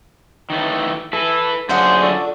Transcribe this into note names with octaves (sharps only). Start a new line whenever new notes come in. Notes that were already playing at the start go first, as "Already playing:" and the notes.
D#3 E3 A3
E4 A4 B4
F#2 D3 D4 F4 G#4 C5 F#5
A4 D5 C#6